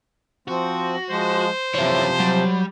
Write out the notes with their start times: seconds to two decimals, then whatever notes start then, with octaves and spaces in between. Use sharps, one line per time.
0.48 F3 C4 F#4
1.10 F3 G#3 C5
1.75 F#2 C3 E3 F3 C#5 E5
2.20 F#3 G3